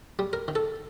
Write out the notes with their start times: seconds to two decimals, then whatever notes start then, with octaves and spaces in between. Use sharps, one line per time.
0.19 G3
0.33 A#4
0.48 D#3
0.55 A4